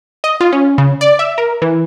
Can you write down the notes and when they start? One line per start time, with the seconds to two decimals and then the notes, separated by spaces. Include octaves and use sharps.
0.24 D#5
0.41 F4
0.53 C#4
0.78 C#3
1.01 D5
1.19 E5
1.38 A#4
1.62 E3